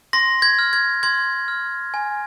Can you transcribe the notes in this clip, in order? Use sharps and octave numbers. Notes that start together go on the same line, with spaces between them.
C6 A#6
G#6
F6
G#6
C6 G#6
F6
G#5